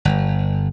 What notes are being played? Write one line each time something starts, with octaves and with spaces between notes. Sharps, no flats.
G1